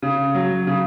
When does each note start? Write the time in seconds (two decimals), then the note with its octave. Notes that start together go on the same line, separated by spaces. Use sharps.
0.02 C#3
0.35 F#3
0.67 C#3